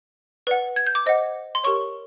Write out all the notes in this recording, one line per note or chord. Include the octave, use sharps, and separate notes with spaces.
B4 D5 F#5
G#6
G6
D6
C5 D#5 F#5
C6
G4 A#4 C#5 C#6